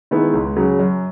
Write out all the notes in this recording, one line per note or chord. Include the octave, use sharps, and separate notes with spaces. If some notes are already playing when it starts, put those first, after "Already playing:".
D#3 G#3 B3 E4
C#2
C#3 F#3
F#2